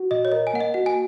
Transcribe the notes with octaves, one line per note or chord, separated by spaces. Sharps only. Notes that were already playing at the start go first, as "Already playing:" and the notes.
Already playing: F#4
A#2 D#5
C#5
A#4 D#5
G#5
A#3 F#5
D#5
F#4 F#5
G#5